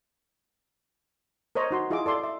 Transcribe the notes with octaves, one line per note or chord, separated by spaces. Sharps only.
A#4 C5 C#5 D#5 A#5
D#4 F#4 C6
E4 F4 G#4 D#5 E5 D6
A4 D5 C6 D6
E5